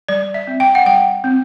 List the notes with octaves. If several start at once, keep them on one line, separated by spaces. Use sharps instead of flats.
G3 D5
E5
C4
G5
F#5
G3 G5
C4